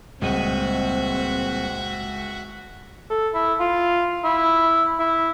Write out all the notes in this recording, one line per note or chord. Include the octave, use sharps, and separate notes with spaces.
C#2 A#2 G3 C4 F#4 D#5 E5
A4
E4
F4
E4
E4